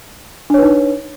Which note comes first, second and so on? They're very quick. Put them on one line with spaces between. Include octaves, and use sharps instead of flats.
D4 C#5 B4 D#4